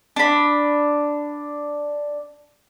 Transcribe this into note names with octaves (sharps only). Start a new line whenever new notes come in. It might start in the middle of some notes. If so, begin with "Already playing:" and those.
D4 B5